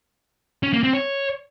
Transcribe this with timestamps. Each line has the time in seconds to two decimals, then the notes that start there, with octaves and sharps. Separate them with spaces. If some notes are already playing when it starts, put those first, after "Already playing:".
0.63 C#4
0.73 A#3
0.83 C4
0.93 C#5